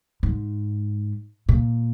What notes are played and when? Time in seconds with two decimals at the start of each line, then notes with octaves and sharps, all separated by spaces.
0.23 G#2
1.49 A#2